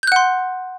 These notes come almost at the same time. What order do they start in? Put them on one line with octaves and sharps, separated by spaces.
G6 F#6 F#5 C6